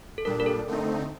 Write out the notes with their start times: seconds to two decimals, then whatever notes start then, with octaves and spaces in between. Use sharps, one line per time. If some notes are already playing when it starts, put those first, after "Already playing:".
0.18 A4
0.25 A#2 G3 D4 A#4
0.40 A#4
0.46 A4
0.68 D3 A3 C4 D#4